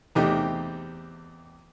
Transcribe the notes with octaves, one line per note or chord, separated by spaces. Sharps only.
E2 C3 A3 D#4 G4